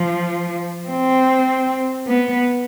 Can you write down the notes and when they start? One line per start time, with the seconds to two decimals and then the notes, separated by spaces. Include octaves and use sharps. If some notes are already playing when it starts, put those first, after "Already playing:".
Already playing: F3
0.87 C4
2.07 B3